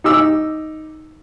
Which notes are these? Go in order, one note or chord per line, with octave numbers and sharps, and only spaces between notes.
D#4 D6 E6